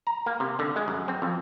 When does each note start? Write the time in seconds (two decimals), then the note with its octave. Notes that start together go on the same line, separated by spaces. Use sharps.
0.07 A#5
0.26 A#3
0.40 C3
0.59 D3
0.76 G#3
0.88 F#2
1.08 C4
1.22 F2